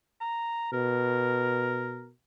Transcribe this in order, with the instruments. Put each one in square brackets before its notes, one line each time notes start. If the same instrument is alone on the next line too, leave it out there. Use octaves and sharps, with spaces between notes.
[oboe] A#5
[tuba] B2 [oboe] A#4